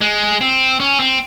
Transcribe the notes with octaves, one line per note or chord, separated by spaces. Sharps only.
G#3
C4
C#4
C4